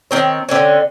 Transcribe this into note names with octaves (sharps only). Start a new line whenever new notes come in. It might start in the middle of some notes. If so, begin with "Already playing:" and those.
D#3 C4 C#5
D3 C4 C#4